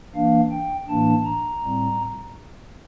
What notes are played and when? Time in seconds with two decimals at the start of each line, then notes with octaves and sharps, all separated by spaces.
0.15 E3 A#3 D4 F5
0.51 G5
0.88 A2 E3 A#3 D4 A5
1.25 A#5
1.62 A2 G3 C4